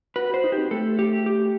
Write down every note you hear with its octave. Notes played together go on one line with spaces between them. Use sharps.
F#4 B4
F#4 C5
D#4
G4
C4
A3 A4
G4
G4